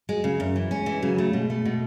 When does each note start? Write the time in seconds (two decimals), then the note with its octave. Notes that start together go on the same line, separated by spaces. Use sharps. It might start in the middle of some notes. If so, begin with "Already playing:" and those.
0.09 F#3 G#3
0.24 C#3
0.40 F#2 F#3
0.56 E3
0.71 G#3 C#4
0.86 E3
1.03 C#3 F#3
1.18 A3
1.33 B2 G#3
1.50 A3
1.65 B2